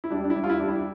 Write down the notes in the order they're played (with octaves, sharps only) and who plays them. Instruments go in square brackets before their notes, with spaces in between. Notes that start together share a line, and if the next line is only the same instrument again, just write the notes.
[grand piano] E4
G3 D4
D4
E4
G3
F4
E4
G3 D4
E4